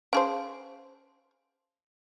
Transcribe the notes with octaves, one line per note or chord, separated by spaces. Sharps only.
C#4 G#4 C5 F5 A5